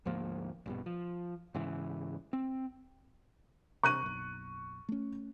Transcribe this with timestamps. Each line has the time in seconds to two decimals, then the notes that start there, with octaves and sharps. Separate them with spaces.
0.05 D2 G#2 F3 A#3
0.66 A#1 G2 B2
0.86 F3
1.54 G#2 C#3 E3
2.33 C4
3.83 C3 C#6 F#6 D#7
4.02 F#1 B1
4.89 A3 C#4